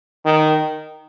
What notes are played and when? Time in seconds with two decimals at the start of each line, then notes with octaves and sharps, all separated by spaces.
0.25 D#3